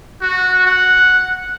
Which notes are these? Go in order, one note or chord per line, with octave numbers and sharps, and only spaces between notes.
F#4
F#5